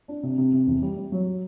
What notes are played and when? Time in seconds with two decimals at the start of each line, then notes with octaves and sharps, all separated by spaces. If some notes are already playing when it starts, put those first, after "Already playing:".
0.08 D4
0.23 C3
0.38 C3
0.53 C3
0.67 E2
0.82 G3
0.97 G3
1.12 F#3